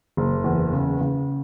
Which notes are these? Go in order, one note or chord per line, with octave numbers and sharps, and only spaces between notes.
F#1
E2
C#3
C#3